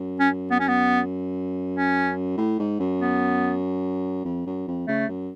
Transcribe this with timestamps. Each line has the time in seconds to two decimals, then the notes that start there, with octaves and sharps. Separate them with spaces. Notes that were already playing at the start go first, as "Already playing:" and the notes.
Already playing: F#2
0.20 C#4
0.51 B3
0.60 C#4
0.68 B3
1.75 C#4
2.37 A2
2.59 G#2
2.80 F#2
3.00 B3
4.25 F2
4.46 F#2
4.68 F2
4.87 C#3 A3
5.08 F#2